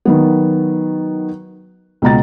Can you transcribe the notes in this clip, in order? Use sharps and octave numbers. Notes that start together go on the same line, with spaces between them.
D#3 F#3 B3
C#2 B2 A#5 A6